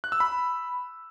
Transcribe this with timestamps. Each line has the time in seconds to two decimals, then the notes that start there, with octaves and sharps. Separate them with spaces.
0.04 F#6
0.12 E6
0.20 B5